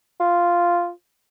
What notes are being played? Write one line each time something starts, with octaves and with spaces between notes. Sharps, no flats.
F4